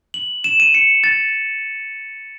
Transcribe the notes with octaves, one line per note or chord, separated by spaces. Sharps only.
F#7
E7
D#7
C#7
A6